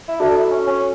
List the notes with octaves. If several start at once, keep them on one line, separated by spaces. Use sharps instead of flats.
E4
D4 F#4 A4 E5
E4
C#4
C#4